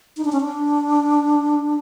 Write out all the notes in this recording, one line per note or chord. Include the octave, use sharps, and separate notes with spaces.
D#4
D4
C#4
D4